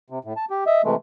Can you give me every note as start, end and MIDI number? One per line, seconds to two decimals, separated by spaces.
0.10 0.19 48
0.25 0.34 45
0.37 0.45 81
0.50 0.64 67
0.67 0.82 75
0.67 0.82 76
0.85 0.95 48
0.85 0.95 52
0.85 0.95 56
0.85 0.95 57